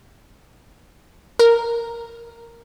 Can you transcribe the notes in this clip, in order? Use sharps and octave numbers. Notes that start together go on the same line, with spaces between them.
A#4